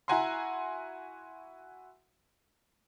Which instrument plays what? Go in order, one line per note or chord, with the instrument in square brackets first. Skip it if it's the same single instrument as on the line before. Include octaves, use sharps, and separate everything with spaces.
[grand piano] E4 F#4 F#5 G#5 A#5 C6